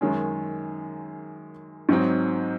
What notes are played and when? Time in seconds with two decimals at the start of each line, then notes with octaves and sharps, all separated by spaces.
0.01 F#2 D#3 G#3 C#4
1.89 G#2 F#3 C4 D#4